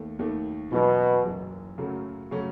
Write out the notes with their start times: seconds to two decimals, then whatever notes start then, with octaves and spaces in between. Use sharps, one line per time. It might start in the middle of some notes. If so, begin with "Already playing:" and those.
Already playing: D#2 D#3 A3
0.19 D#2 D#3 A3
0.72 F#1 F#2 B2 E3
1.25 F#1 F#2 E3
1.78 F#2 C#3 F#3 A3 C#4
2.31 C#3 F#3 A3 C#4